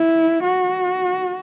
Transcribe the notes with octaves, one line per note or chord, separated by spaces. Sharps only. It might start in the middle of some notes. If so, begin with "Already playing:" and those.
Already playing: E4
F#4